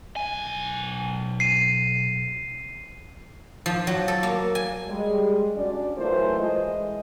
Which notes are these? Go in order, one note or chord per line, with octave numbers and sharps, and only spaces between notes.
B1 G#5
C7 D#7
F3
F#3
A4
A#3
G#5
G3 G#3
C#4 D4 F#4 D5
E3 F#3 A3 F4 A#4 C5
E3 G#3 D#5